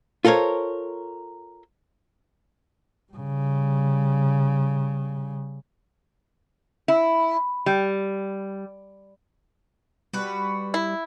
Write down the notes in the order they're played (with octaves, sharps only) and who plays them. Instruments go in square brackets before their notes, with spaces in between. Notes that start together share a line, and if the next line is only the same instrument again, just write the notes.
[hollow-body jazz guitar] F4 A4 A#4 C5 C#5
[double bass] C#3 G3
[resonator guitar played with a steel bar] E4
G3
[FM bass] G3 [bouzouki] F#4 B4
[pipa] E4